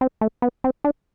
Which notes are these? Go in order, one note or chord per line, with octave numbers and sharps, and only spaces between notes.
C4
A3
B3
C4
D4